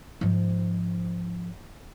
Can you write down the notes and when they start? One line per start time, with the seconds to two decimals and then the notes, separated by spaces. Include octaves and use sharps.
0.21 G#2 F3